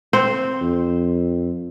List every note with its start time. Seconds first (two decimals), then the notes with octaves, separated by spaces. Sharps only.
0.13 C4 C5
0.61 F2